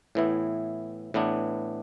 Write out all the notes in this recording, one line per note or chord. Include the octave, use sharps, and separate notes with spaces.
A2 E3 B3 E4
A2 E3 B3 D4